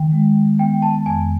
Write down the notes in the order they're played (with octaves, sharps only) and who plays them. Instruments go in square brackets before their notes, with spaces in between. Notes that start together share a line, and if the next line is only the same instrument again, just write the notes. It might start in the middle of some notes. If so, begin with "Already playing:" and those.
Already playing: [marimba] D#3 [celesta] G5
[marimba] G#3
[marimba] B3 [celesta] G5
[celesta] A5
[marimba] F2 [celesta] G#5